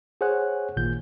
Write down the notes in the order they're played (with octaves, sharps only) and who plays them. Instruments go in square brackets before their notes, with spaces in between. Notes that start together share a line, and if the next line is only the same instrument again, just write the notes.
[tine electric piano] G#4 C5 C#5 F#5 G#5 F#6
A1 A#2 D#3 G6